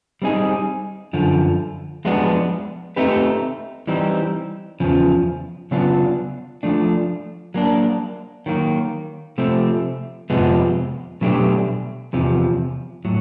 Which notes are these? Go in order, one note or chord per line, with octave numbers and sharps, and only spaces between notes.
G3 C4 D#4 G#4
F#2 D3 F3
F3 G#3 B3 D4 F#4
A3 C4 D#4 G4 B4
E3 G3 C4 D#4
E2 C#3 F3
C#3 F#3 B3 D4 F4
F3 A3 D4
F#3 A#3 D4
D#3 F#3 A#3
C3 F3 A3 C4
F2 C3 F3 G#3 B3
B2 F#3 A3 D4 G4
E2 C3 F3
A2 F#3